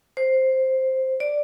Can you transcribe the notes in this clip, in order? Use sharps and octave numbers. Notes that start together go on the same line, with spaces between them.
C5
D5